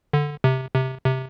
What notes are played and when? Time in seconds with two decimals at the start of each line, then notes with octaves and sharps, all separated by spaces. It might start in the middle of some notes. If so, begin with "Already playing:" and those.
0.13 D3
0.44 C3
0.74 C3
1.05 C3